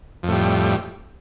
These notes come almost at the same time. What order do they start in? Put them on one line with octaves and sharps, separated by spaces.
F2 A2 G3